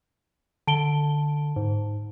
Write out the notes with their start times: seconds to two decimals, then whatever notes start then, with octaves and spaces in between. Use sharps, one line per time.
0.67 D3 A5 D7 G7
1.56 G#2